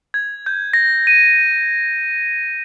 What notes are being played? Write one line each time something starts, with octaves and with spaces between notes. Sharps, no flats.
G#6
G6
A#6
D#7